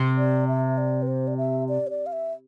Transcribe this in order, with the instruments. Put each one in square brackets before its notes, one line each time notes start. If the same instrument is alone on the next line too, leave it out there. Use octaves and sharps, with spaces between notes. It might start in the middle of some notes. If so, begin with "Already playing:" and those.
Already playing: [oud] C3
[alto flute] D5
E5
D5
B4
C5
D5
E5
D5
C5
D5
F5
E5